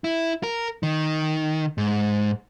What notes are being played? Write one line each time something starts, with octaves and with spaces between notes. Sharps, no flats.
E4
A#4
D#3
G#2